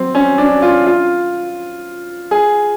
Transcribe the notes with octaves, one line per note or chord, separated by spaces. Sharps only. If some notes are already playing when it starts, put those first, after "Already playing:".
Already playing: F#3 C4
C#4
D4
F4
F4
G#4